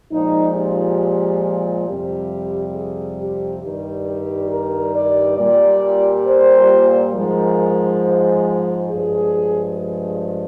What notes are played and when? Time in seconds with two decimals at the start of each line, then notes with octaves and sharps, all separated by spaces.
0.12 A#2 F3 G#3 D#4
0.56 G4
1.87 F2 C3 G3 G4
2.75 G#4
3.20 G4
3.63 G2 D#3 G3
4.08 G4
4.51 A#4
4.96 D5
5.39 A#2 G3 D5
6.27 C5
7.14 G#2 F3 G#3 A#4
8.03 C5
8.90 G2 F3 G#3 G#4
9.78 G#4